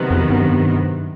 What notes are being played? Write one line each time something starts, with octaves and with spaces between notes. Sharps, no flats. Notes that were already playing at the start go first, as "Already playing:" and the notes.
Already playing: C3 D#3 F#3 B3
F2
G2